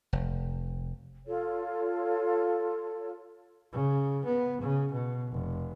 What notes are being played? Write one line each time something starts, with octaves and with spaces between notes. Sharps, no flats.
F1
F4 A4 C#5
C#3
B3
C#3
B2
F1